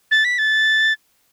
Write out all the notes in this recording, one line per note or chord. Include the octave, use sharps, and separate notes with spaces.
A6
B6
A6